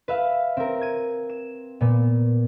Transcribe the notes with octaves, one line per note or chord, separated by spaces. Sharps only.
B4 E5 F5
C4 A#4
G#6 D#7
E7
A#2 B3